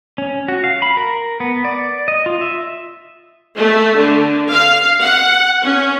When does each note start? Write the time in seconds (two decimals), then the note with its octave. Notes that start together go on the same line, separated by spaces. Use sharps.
0.18 C#4
0.48 F#4
0.64 F5
0.82 B5
0.97 A#4
1.40 B3
1.65 D5
2.08 D#5
2.26 F4
2.41 E5
3.58 A3
3.98 D3
4.50 F5
5.01 F#5
5.64 C#4